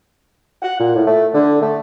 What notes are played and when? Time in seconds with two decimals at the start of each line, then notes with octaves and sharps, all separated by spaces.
0.62 F#5
0.79 A#2
0.95 A2
1.07 A3
1.34 D3
1.61 A3